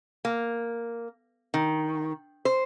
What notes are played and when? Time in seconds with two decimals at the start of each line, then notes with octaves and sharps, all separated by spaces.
0.25 A#3
1.54 D#3
2.45 C5